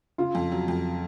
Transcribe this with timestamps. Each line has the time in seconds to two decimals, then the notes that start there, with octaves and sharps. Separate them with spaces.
0.18 C#3 F4
0.35 F2
0.52 F#3
0.68 F2